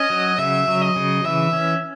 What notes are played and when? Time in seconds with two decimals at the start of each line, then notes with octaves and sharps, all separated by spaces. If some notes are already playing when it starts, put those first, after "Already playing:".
Already playing: C#4 D#5
0.10 F#3
0.38 C#3 E5
0.68 F#3
0.81 D#5
0.96 C#3
1.24 E3 E5
1.53 C#4